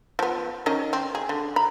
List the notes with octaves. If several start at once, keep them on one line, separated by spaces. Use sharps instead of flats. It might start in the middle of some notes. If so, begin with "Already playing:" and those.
F3 B3
D#3 C#4 D#5
C4
G#4
D3
A#5 B5